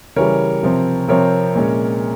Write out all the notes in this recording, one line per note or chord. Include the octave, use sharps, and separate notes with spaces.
C#3 E3 G3 A#4 C#5
C3 F3 C4
C3 F3 C4 A#4 C#5
A#2 G#3 C#4